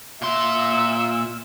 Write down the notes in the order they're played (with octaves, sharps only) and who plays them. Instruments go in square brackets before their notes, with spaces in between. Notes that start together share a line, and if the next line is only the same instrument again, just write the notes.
[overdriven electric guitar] A#2 C6 [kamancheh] E5 E6